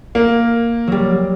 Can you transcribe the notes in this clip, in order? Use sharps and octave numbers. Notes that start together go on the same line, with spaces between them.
A#3
F#3 G3